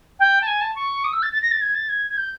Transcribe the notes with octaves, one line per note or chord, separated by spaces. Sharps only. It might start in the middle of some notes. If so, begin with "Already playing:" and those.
G5
A5
G#5
A5
C#6
D#6
E6
A6
A6
A#6
A6
G#6
A6
G#6
G#6
G6